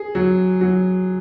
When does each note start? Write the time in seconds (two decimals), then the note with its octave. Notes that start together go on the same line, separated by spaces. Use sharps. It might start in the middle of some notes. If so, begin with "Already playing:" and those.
Already playing: G#4
0.15 F#3
0.61 F#3